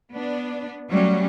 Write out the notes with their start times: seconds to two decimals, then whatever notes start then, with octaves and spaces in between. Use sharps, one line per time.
0.11 B3 D4
0.90 F#3 G3 A3 C#4